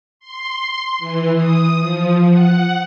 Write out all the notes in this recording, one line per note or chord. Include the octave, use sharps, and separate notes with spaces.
C6
E3
D#6
F3
F#5